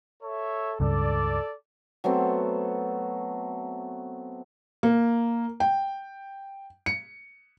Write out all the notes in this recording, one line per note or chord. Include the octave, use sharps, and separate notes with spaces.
A4 C#5 E5
C#2 G2 C#3 A4 D5
F#3 A3 B3 C4
A#3
G5
C#7